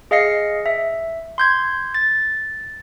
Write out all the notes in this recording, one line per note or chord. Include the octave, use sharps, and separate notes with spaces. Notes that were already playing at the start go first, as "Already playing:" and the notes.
G#4 D#5 F5 A#6 C7 C#7
E5
C6 G6 G#6
A6